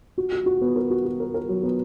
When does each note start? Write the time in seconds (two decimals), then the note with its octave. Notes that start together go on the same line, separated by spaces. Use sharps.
0.18 F#4
0.32 F#4
0.46 F#4
0.62 B3
0.76 A#4
0.91 F#4
1.05 F#4
1.20 A#4
1.34 A#4
1.49 F#3
1.63 B3